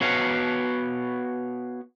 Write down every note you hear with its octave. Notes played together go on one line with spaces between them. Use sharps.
B3 F#4 B4 C#5 F5